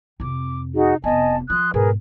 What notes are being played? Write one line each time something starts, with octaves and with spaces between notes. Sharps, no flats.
F2 C3 D6
D#4 F#4 G#4
F1 B3 D#5 G#5 A5
F3 C6 D#6 F#6
G#2 B2 G#4 A#4 B4